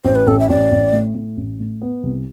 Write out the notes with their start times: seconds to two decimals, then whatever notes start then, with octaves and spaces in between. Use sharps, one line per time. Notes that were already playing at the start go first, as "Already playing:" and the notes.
0.05 A1 C5
0.15 B4
0.27 A1 A4
0.39 E5
0.49 A1 D5
0.72 A1
0.93 A2
1.15 A2
1.37 A1
1.60 A2
1.82 B3
2.03 C2